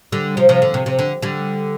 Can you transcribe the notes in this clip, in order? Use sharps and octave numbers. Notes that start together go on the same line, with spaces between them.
D3 G3
C3 F3
C3 F3
D3
C3
C3
D3
D3 G3